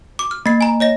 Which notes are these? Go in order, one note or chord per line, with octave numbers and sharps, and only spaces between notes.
D6
F6
A#3 A6 C7
G#5 A#5
C#5 D#5 A#6